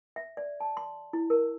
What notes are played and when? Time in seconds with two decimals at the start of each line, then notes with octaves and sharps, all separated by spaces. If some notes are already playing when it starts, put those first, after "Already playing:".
0.16 E5
0.37 D5
0.60 A5
0.77 C6
1.13 E4
1.30 A#4